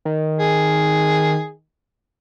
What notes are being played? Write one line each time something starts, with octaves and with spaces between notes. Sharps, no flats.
D#3
G#4